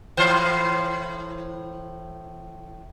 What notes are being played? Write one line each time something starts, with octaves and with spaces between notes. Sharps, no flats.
A2 E3 C5